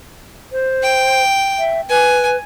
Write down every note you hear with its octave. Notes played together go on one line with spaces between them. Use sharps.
C5
G5
E5
B4 G#5